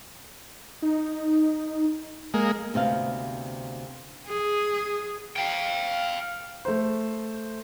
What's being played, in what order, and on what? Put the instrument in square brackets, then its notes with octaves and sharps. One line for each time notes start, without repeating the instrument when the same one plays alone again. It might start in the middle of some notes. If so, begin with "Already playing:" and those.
[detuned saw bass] D#4
[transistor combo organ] G#3 A#3
[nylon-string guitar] D2 C3 B3 F5
[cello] G#4
[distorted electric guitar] F5 G5
[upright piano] A3 C5